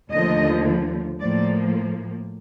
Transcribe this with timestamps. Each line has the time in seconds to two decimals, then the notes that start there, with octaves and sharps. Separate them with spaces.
0.11 D#2 D3 F3 A3 D#5
1.20 A2 F3 A#3 D5